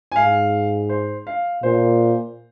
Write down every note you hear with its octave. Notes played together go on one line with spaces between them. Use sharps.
G#5
G#2 F5
C5
F5
A#2 C5